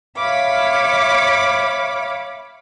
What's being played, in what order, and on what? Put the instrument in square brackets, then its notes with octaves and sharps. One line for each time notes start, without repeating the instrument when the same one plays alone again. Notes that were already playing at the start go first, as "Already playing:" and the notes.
[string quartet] C#5 E5 F5 B5 D6